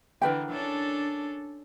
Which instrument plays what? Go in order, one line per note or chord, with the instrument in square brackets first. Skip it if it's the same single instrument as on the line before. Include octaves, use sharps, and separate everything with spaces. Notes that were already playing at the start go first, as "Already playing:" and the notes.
[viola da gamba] D3 E3 [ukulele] A#4 B4 G5
[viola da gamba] C#4 D4 A4